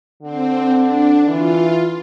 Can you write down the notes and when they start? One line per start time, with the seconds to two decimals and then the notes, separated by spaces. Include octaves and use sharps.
0.23 D3 C4
0.76 D4
1.28 E3 F4